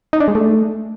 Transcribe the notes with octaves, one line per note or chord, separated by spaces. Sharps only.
D#4
D4
G#3
A3